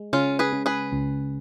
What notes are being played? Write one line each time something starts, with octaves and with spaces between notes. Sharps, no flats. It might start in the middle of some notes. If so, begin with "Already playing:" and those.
Already playing: G#3
C#3 C#4 F4
G#4 B4
C#3
G#4 B4
C#2